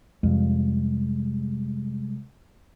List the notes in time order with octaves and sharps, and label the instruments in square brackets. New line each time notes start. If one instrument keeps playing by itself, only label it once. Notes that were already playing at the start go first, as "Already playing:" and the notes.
[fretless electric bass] F2 [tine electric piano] C3 G3 G#3